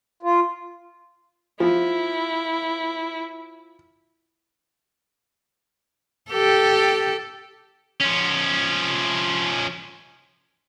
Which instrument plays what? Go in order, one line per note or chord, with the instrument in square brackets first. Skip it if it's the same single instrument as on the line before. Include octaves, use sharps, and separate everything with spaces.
[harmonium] F4
[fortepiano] F3 [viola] E4
[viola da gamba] G4 A4
[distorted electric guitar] F3 C#4